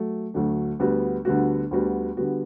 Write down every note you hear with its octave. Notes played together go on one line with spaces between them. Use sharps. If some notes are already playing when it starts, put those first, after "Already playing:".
Already playing: F#3 A3
D2 D3 F#3 A3 D4
D2 D3 G3 B3 F#4
D2 D3 G3 B3 F#4
D2 D3 G3 B3 F#4
D3 G3 B3 F#4